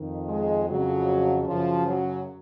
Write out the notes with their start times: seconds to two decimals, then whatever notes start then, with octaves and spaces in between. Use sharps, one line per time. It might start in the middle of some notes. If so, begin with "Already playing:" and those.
Already playing: F2 D#3
0.29 G#3
0.69 F2 C#3 F#3
1.47 F#2 C#3 F3
1.86 F#3